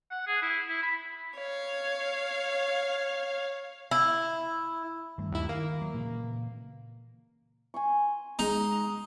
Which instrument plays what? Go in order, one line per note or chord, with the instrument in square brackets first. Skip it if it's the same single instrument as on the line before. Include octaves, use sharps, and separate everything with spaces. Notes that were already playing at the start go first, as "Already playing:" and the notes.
[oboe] F#5
G#4
E4
E4
B5
[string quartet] C#5 F5
[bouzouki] E4
[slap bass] G2 D#3 A3
[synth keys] D#2 E4
[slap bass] D#3 [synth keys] A#3
[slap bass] F#3
A#2 C#3 E3
[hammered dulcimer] G#5 C6 C#6
[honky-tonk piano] G#3 [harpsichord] D#4